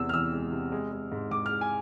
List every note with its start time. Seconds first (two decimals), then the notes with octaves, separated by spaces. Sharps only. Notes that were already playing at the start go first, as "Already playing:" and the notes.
Already playing: E2 C3 G#3 E6
0.09 F6
0.13 E3 E6
0.33 G#3
0.52 C3
0.72 G#3
0.92 G#3
1.12 G#2
1.31 G#2 D6
1.46 F6
1.51 G#3
1.61 G#5